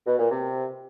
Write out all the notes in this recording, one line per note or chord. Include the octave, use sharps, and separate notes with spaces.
B2
A#2
C3